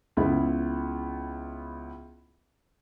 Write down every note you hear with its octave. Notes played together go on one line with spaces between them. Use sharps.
C#2 B3 E4